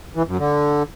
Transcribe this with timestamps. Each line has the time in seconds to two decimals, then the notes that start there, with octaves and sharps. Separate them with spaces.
0.16 E3
0.27 F#2
0.38 D3